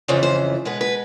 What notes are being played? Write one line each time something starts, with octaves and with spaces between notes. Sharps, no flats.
F2 C#3 E3 A3 C5
C5
B2 G#3 B3 B4
B4